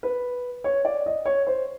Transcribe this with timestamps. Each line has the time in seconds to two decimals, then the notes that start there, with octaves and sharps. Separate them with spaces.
0.03 B4
0.64 C#5
0.85 D5
1.06 D#5
1.26 C#5
1.47 C5